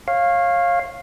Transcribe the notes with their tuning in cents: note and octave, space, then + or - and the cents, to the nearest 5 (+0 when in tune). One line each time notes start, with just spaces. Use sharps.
C#5 -25 F5 +0